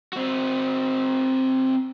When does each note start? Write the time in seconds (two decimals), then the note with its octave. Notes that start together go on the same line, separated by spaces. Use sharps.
0.13 C4 F#4